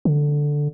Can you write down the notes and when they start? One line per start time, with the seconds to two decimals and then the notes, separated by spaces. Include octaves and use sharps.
0.05 D3